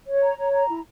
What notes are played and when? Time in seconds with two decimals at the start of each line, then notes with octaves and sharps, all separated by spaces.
0.08 C#5
0.22 A#5
0.38 C#5
0.53 A#5
0.69 E4